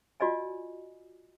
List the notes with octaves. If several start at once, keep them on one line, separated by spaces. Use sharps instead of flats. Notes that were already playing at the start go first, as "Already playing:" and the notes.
F4 F#4 D5 D#5 G#5